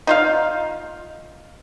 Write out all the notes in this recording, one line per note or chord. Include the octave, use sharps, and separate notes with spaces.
D#4 F4 F5